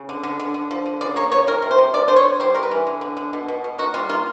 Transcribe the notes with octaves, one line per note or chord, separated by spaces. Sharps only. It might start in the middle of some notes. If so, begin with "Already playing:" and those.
Already playing: C#3
D3
D3
D3
D3
F3
D3
C#3 D5
A#3 C#5
C#3 C#5
F3 A#4
C3
C5
C3
F3 D5
D3 C5
C#5
D3
G3 C5
G3 A#4
B4
E3
D3
D3
D3
B2
B2
B2
A#3 F#4
G3 F4
A#3 F4